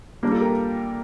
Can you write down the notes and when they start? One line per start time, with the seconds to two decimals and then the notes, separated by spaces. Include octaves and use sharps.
0.23 G3 A#3 D4
0.32 F4 A4
0.40 G4 A#4